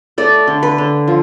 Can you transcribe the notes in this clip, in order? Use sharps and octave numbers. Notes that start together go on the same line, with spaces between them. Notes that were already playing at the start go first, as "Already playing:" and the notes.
A3 D5
D3
B4
D3
F3